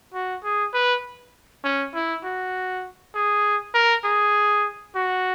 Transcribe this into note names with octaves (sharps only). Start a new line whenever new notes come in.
F#4
G#4
B4
C#4
E4
F#4
G#4
A#4
G#4
F#4